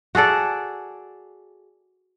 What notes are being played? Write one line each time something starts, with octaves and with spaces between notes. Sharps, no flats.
F#4 G#4 A4 D5